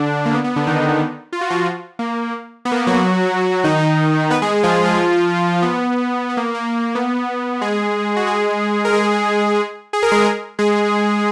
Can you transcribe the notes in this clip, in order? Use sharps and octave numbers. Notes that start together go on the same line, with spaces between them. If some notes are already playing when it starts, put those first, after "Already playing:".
Already playing: D3 D4
A#3
B3
B3
D3 D4
D#3 D#4
F4
F#4
F3 F4
A#3
B3
A#3
B3
F#3 F#4
D#3 D#4
B3 B4
G#3 G#4
F3 F4
F3 F4
F3 F4
B3
B3
A#3
A#3
B3
G#3 G#4
F#4
G#3 G#4
A#4
G#3 G#4
G#4
A#4
G#3 G#4
G#3 G#4